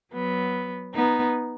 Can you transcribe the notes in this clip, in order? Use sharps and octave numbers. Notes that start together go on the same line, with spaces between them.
F#3 B3
B3 D#4